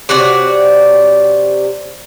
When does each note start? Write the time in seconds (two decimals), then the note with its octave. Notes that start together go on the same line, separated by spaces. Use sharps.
0.09 C3 F#4 C#5 D5